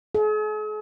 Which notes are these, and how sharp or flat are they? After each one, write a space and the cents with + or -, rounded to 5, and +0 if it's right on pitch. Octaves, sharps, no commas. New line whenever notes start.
G#4 +45